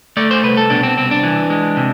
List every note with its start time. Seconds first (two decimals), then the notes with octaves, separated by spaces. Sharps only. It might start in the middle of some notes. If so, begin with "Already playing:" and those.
0.17 A3 D5
0.31 C5
0.43 C2 B4
0.57 A4
0.70 B2 D4
0.83 C4
0.97 C2 C4
1.11 D4
1.23 E3
1.50 G#3
1.77 C3